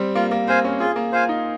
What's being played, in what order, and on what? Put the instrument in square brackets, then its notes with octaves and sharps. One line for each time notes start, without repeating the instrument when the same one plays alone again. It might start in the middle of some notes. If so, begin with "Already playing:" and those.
Already playing: [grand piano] G3 C4
[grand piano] A#3 [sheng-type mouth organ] F4
[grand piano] A#3
[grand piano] C4 [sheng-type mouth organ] C5 F5 G#5
[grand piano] C#4
[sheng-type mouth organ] F4 [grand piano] G#4
[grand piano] A#3
[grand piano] F4 [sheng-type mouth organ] C5 F5 G#5
[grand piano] D#4